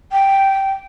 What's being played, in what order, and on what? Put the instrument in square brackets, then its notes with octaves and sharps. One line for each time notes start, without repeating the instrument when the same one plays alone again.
[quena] G5